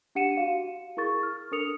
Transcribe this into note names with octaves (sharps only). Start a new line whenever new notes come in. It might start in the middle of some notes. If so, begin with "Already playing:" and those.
D4 G4 F#5 C#7 D#7 E7
F#4 F5
E4 G#4 A#4 C#6 A6
F6
D4 A4 A#4 D#6 C#7 F7